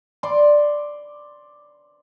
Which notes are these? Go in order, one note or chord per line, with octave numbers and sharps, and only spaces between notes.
D5 C6 D6